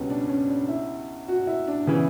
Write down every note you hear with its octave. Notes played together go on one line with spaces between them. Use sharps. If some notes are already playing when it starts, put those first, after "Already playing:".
Already playing: C#2 B2 G3 B3 C#4
D4
C#4
D4
E4
F#4
E4
D4
C#3 E3 B3